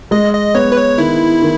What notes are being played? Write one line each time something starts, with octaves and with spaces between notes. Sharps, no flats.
G#3 D#5
D#5
B3 C#5
B4
C#5
D#3 E4
D#3